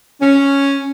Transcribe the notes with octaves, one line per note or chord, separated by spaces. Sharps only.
C#4